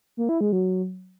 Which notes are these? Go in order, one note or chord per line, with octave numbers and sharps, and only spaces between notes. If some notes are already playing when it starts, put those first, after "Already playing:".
A#3
E4
G#3
F#3